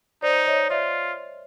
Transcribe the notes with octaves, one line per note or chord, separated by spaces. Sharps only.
D#4 C5 D5
C#5 D#5
F4 D5 E5